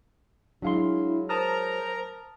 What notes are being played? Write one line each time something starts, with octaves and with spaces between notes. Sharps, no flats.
F#3 G#3 D4 E4 F5 C6
A#4 C5 A5 A#5 D#6 F6